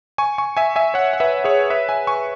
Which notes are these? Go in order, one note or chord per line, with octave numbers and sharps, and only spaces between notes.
G#5 C#6
G#5 C#6
E5 G#5
E5 G#5
C#5 F#5
F#5
B4 E5
G#4 C#5
B4 E5
E5 G#5
G#5 C#6